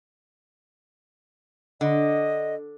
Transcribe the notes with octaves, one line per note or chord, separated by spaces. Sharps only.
D3 D#5